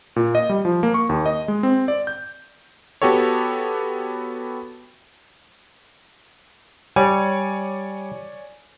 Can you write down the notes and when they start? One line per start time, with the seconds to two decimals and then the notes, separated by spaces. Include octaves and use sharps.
0.16 A#2
0.35 D#5
0.49 G3
0.65 F3
0.83 A#3
0.94 C#6
1.09 D#2
1.26 D#5
1.48 G#3
1.63 C4
1.88 D5
2.07 G6
3.02 B3 F#4 G4 A4 C#5
6.96 G3 C#5 D5 G#5